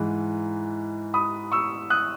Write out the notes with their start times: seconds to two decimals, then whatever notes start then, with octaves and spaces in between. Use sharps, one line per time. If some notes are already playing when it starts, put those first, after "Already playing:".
Already playing: G#2 E3
1.14 B5 D#6
1.52 C#6 E6
1.90 D#6 F#6